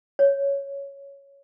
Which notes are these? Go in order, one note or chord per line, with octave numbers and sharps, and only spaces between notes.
C#5